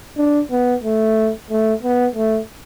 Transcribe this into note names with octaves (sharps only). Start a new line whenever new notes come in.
D4
B3
A3
A3
B3
A3